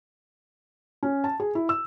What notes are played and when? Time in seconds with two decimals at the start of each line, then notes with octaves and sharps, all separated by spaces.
1.03 C#4
1.24 A5
1.40 G#4
1.55 E4
1.69 E6